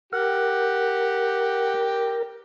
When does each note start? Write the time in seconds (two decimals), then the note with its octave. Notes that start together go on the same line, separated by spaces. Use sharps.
0.13 G4 A#4 F#5